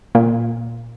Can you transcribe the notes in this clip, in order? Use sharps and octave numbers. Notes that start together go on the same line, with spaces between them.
A#2